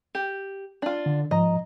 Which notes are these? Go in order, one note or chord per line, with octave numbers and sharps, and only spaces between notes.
G4
D4 F4
D3
G#2 F3 D#5 A#5